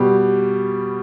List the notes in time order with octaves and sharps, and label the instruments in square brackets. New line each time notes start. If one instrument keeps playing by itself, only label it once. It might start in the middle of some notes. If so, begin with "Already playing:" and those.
Already playing: [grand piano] B2 G3 G4